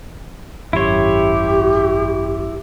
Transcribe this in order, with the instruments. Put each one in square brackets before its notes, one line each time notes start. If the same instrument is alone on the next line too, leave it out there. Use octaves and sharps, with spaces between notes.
[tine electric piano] G#1 F#2 C6 [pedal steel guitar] E4 C#5 [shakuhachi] G4